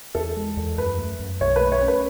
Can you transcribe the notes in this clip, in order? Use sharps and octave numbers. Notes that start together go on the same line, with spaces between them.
E2 A4
G#3
E2
F#2 B4
A3
F#2
B1 C#5
A3 B4
C#5
C#4
B4